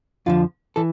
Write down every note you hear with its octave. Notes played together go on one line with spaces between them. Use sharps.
F2 D3 F3 F4
E3 A4